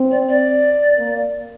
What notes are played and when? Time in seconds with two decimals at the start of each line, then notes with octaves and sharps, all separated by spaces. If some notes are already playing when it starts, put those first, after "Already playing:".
Already playing: C4
0.11 D5
0.28 D5
0.97 A#3